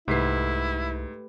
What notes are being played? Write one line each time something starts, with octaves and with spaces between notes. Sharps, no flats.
C2 G#2 A3 E4 G4 B4 B6 C7